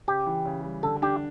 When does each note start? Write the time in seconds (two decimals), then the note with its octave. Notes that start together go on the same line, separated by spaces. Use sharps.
0.08 C#3 G4
0.26 E3
0.45 C#3
0.64 G3
0.83 D3 A4
1.02 D4 G4